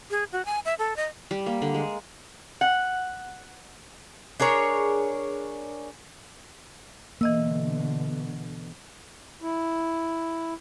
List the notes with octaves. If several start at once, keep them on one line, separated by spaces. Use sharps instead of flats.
G#4
F#4
G#5
E5
A4
D#5
G3
A#3
D3
G#3
F#5
D4 G#4 A#4 C#5
B2 D3 E3 A#3 D#5 E6
E4